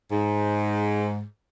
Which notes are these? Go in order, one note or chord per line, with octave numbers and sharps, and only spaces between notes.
G#2